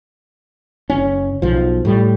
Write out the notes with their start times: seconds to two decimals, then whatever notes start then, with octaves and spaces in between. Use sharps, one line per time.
0.90 F#1 C#4
1.42 B1 F3
1.85 A2 G3